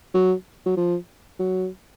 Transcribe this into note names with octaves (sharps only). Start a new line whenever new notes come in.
F#3
F#3
F3
F#3